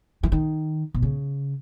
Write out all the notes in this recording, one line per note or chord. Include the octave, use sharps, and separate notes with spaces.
E3
D#3
B2
C#3